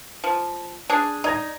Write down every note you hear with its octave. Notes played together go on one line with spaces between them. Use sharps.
F3
D4 G#4
D#4 D5 G#6 A#6